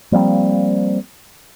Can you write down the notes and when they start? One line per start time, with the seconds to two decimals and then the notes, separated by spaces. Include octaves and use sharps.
0.12 F3 G3 A#3 C4